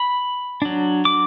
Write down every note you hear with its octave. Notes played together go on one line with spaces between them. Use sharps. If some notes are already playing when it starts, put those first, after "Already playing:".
Already playing: B5
F#3 D4
D6